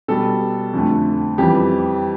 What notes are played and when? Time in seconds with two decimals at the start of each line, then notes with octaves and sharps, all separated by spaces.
0.08 B2 G3 A4
0.73 F2 D3 A3
1.38 F2 E3 G3 G4